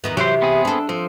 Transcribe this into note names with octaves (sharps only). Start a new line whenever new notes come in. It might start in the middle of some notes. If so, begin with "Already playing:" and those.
E2 D#3 B3
C3 E3 F#3 G4 C5
B3 C4 G#4
D4 A4
F3 C4